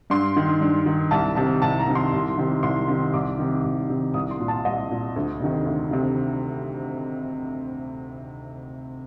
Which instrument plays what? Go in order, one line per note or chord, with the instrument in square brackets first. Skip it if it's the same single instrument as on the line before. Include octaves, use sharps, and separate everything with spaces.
[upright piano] G2 C6
D#3
G2
D#3
C2 A5
C3 D#3 A5
C2 A5
A#5
C3 D#3
C6
C2
C3 D#3
C2 C6
C3 D#3
C2 D6
C3 D#3
C2
C3 D#3
C2 D#6
C6
A#2
A5
C2 D#5
A#2
D2
C3 D#3
D2
C3 D#3